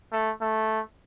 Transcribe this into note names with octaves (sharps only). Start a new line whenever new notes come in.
A3
A3